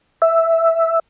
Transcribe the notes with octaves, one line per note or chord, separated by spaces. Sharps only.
E5